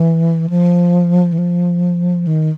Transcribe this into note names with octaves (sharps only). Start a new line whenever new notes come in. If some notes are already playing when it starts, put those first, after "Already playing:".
Already playing: E3
F3
E3
F3
D#3